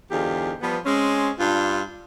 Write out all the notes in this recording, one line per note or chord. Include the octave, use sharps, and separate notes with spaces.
E2 G#2 D3 F4 G4
F3 G3 B3
G#3 C4 C#4
G2 D4 F4